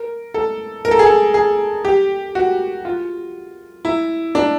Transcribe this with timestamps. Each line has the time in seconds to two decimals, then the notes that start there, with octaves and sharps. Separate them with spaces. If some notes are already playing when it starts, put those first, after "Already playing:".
Already playing: A#4
0.34 A4
0.85 A#4
0.91 A4
0.99 G#4
1.06 A4
1.34 G#4
1.85 G4
2.35 F#4
2.85 F4
3.85 E4
4.35 D4